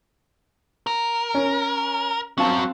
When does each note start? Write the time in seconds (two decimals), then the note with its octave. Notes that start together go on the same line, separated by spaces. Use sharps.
0.87 A#4
1.34 C#4
2.38 F#2 F#3 C4 F5 A5